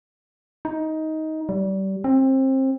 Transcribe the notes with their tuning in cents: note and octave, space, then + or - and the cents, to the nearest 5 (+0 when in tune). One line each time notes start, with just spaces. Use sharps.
D#4 +15
G3 -30
C4 +25